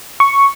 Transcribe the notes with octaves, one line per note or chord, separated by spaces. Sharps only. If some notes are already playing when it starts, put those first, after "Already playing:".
C#6